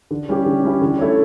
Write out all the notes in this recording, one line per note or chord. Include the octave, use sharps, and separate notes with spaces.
D3
G3 C#4 E4 G4
D3
G3 C#4 E4 G4
D3
A3 E4 A4 C#5